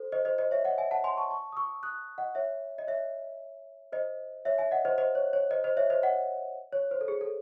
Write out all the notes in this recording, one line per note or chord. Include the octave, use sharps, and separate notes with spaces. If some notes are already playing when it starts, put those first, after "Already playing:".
Already playing: A4 C5
C5 D#5
C5 D#5
C5 D#5
C#5 E5
D#5 F#5
E5 G#5
F#5 A5
G#5 C6
A5 C#6
A5 C#6
D#6
C#6 E6
D#6 F#6
D#5 F#5
C#5 E5
D#5
C#5 E5
C5 D#5
C#5 E5
E5 G#5
D#5 F#5
C5 D#5
C5 D#5
C#5
C#5
C5 D#5
C5 D#5
C#5 E5
C5 D#5
D#5 F#5
C#5
C5
A4
G#4
A4